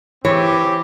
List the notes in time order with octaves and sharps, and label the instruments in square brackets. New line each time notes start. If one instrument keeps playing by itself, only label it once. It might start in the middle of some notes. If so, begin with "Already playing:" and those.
[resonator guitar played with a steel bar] E3 [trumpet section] C4 G4 [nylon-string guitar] C#5